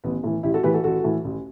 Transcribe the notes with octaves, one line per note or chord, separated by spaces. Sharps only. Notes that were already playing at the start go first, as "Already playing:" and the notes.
A1 B3
A2 E3
A1 E4 G4
F#4 A4
A2 E3 G4 B4
F#4 A4
A1 F#4 A4
A2 E3
A1